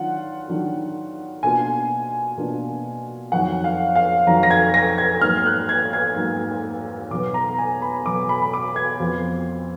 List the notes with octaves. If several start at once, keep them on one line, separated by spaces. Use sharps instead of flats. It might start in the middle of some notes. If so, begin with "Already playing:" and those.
Already playing: D#3 F#3 D4 F4 F#5
D#3 F#3 D4 F4
B2 A#3 D4 F4 G#5
B2 A#3 D4 F4
F2 D#3 F#3 F#5
F5
F5
F2 D#3 F#3 A#5
A#6
G#6
A#6
G#6
G#2 F#3 A#3 F6
F#6
G#6
G#6
G#2 F#3 A#3
B2 F#3 B3 D6
A#5
G#5
B5
B2 F#3 B3 D6
B5
B5
D6
G#6
F2 F3 B3